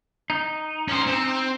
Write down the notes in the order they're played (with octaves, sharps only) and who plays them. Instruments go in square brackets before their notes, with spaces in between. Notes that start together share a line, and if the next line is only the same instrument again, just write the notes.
[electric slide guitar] D#4
[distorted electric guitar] C#4 C5
C4